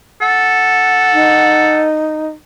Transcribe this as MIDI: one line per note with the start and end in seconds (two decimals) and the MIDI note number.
0.21 1.86 69
0.21 1.87 78
1.13 2.28 63